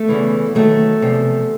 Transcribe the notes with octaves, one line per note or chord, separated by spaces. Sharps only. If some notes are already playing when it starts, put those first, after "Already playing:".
Already playing: A3
E2 C#3 E3
D#2 D#3 F#3 A3
E2 C3 F3